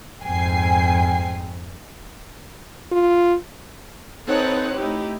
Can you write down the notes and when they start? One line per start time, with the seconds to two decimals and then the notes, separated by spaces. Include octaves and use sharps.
0.24 F2 G#2 G5 G#5 C7
2.92 F4
4.28 C4 D#4 A4 B4 C#5 F#5
4.75 A3 D#4 E4 G4